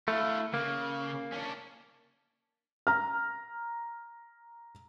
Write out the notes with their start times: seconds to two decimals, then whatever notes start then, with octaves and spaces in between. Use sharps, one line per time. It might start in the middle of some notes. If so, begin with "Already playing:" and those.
0.08 A3 E4 F5
0.54 C#3 A#3
1.32 C#4 D4
2.87 A#5 F6